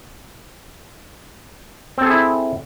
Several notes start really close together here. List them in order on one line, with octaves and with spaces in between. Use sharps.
C4 A4 G#4 E4